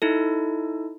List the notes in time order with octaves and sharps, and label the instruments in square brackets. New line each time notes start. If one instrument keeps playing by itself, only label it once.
[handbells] D#4 E4 A4